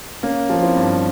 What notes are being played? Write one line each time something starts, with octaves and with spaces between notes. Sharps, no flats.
A#3 C#4
F3
C4 E4
G2